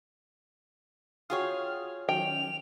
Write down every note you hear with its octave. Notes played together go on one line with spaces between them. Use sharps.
F4 F#4 G#4 C#5 G5 D#6 F6
D#3 F#3 C#4 G5 F7